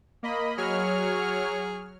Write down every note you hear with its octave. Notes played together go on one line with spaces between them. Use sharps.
A#3 D#5 B5
F#3 G#4 C#5 F6